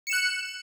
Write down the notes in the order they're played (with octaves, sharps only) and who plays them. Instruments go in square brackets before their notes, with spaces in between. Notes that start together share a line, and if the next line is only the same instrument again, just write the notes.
[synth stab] C#7
E7
F#6